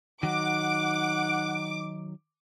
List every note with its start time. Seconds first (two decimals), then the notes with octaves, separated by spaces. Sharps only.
0.23 D#3 F#3 D#4 F#5 D6